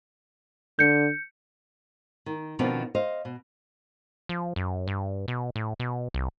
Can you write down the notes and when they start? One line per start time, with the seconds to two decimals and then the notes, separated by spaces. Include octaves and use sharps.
0.79 D3 G6 C#7
2.26 D#3
2.59 B2 D#3 F3 B3 C4 D4
2.95 C5 D#5 F5
3.25 B2
4.29 F3
4.56 F#2
4.87 G2
5.28 B2
5.56 A2
5.80 B2
6.14 C2